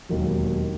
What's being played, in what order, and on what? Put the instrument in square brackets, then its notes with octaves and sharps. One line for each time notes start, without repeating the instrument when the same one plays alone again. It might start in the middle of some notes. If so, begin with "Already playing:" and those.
[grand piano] E1 D#2 D#3 F#3